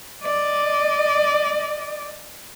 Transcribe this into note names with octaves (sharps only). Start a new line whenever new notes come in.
D5 D#5